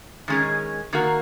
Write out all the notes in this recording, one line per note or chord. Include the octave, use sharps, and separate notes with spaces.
D#3 G#3 C#4 G#4
D#3 A#3 F#4 A#4